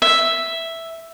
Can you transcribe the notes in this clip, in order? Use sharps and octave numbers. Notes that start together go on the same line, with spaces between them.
E5